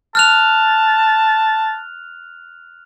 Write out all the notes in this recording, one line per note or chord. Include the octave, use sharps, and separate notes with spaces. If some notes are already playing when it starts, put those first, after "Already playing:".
A5 F6 F#6 F7